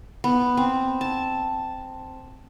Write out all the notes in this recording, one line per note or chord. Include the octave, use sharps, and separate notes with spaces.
B3
C4
A5